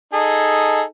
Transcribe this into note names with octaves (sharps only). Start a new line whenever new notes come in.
D#4 G#4 A4